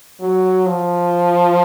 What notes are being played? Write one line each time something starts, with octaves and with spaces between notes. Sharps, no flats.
F#3
F3